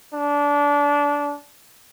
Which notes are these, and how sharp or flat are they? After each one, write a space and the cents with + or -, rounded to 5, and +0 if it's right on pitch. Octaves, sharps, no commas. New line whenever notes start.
D4 -20